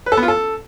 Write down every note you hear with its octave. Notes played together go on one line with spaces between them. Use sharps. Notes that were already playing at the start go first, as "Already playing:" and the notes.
B4
A4
B3
F4
A4